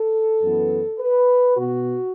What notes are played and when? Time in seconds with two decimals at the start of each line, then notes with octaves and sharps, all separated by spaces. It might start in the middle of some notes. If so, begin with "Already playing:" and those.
Already playing: A4
0.41 F#2 E3 B3
0.98 B4
1.56 B2 B3 F#4